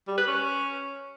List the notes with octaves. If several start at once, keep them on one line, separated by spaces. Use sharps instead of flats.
G3
B4
C#4